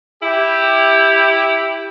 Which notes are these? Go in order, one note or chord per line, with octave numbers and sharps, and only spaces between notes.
E4 G4